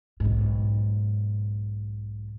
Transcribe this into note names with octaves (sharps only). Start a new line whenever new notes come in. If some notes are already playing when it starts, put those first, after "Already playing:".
B1 G#2